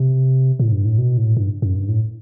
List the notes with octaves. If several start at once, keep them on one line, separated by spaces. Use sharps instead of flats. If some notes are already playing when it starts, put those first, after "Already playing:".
Already playing: C3
A2
G2
A2
B2
A2
G2
F#2
G2
A2